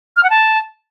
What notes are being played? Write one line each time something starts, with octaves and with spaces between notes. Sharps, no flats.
F6
F#5
A5